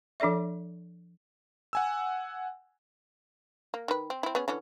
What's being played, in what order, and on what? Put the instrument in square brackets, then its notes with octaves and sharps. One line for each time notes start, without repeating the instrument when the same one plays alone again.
[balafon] F3 D4 A4 D5 E5
[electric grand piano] F#5 G#5 E6
[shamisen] A#3
D#3 B4
C4
C4 E4
B3 C#4 G#4
D3 E3 C#4